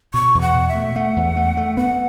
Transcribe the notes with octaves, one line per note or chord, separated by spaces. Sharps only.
B2 C#6
E2
F#5
B2
E5
A3
A3 F#5
E2
A3
A3
B3 F#5